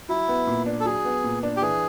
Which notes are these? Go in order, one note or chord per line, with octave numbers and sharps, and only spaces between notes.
F#3 E4
B3
A#2
D4
A4
F#3 G#4
B3
A#2
D4
G4
E3 G#4